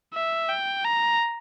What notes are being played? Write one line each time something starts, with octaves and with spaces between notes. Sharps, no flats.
E5
G5
A#5